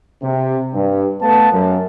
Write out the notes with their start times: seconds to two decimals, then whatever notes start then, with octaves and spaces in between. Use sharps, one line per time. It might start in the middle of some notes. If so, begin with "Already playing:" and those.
0.23 C3
0.75 G2
1.21 A3 B3 F5 A5
1.53 F#2